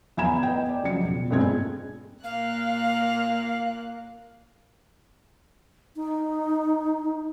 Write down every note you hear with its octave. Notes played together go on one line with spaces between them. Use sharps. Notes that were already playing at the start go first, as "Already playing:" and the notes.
E2 G#5 A#5 B5 G#6 E7
B3 D#5 G5
D5
C#2 C#3 F3 F#3 C#7
E1
G2 B2 G#3 C4 F4 G#6
A#2 A#3 F5 F#6
D#4